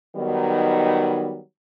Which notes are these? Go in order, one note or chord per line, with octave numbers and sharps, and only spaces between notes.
D#3 F#3 G3 B3 D#4